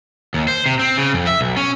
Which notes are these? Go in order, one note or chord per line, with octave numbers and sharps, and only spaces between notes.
D#2
C5
C3
C4
C#3
F2
E5
B1
C#4